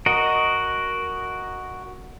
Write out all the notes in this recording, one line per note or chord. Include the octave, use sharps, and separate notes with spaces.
F#4 A#4 D#5